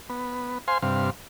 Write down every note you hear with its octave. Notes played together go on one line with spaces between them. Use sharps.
B3
C5 F5 G#5 C6
G2 C3 F5